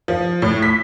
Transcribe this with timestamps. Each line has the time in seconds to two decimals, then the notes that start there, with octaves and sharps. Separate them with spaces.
0.08 F3
0.42 A2
0.62 B6